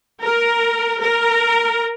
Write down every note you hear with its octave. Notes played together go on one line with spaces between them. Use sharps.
A#4
A#4